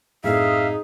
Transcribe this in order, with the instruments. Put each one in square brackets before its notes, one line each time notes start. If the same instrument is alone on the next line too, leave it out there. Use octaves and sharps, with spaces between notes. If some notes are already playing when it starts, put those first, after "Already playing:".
[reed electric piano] F#2 A2 C4 [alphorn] D#4 [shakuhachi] G#4 [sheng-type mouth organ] E5 F5